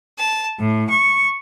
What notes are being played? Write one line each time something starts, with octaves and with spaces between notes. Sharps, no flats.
A5
A2
C#6